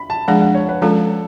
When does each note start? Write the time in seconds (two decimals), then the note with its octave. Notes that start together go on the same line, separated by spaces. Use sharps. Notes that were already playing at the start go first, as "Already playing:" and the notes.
Already playing: B5
0.10 A5
0.28 F3 G#3 D4 G#4 F#5
0.42 F#5
0.55 C#5
0.69 B4
0.82 F3 G#3 C#4 F4 A4